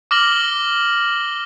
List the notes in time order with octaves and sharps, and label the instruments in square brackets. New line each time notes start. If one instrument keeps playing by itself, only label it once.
[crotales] D6 F6 A#6 F#7 G7